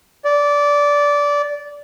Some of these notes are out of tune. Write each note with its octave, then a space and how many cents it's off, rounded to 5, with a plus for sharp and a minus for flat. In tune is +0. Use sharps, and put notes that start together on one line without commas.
D5 -15